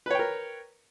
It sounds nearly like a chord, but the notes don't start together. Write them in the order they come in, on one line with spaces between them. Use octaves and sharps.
B4 C#5 G5 A#4